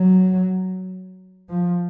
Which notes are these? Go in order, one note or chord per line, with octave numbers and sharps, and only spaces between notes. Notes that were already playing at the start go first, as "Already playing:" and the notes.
Already playing: F#3
F3